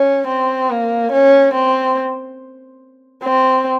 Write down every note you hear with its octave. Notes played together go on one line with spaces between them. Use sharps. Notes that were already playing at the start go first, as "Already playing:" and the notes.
Already playing: C#4
C4
A#3
C#4
C4
C4